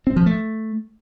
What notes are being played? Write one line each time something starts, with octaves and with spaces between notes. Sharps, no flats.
C4
F3
A3